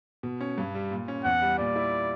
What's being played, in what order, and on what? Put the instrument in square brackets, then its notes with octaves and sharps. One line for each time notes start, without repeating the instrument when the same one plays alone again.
[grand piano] B2
C#4
G2
G3
A#2
C#4
[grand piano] E2 [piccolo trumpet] F#5
[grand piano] G3
[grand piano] A#2 [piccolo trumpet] D5
[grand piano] E4